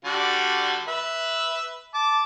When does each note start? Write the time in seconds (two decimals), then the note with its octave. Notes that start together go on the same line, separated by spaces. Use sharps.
0.05 D3 G3 F#4
0.88 B4 E5
1.94 A5 D6